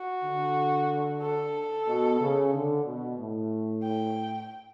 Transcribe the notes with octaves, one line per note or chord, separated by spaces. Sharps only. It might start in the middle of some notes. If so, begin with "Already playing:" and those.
Already playing: F#4
D3
A4
B2
C#3
D3
B2
A2
G5